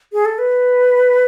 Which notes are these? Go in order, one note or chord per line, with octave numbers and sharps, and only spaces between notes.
G#4
A4
B4